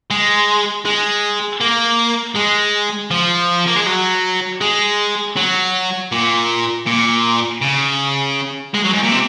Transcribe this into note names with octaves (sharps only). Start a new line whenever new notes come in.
G#3
G#3
A#3
G#3
F3
A#3
G#3
F#3
G#3
F#3
A#2
A#2
C#3
G#3
F#3
G#2
A#2
C3